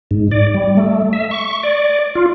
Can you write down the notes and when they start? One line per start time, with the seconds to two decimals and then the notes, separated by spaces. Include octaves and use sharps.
0.11 G#2
0.31 D5
0.54 G3
0.77 A3
1.13 E5
1.31 C#6
1.63 D5
2.15 F4